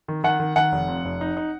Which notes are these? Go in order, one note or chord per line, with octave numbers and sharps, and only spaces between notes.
D#3
D#3 F#5
D#3
D#3 F#5
F1
F2
F1
D#4
D#4